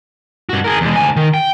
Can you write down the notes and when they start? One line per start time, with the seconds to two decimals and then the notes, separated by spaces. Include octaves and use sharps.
0.49 G2 F#4
0.64 G#4 A#4
0.81 E2 G#3
0.96 D2 G#5
1.17 D#3
1.34 G5